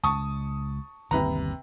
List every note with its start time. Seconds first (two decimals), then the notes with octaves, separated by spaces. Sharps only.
0.04 C#2 A5 C#6 D#6
1.11 G1 D#2 C3 B4 A#5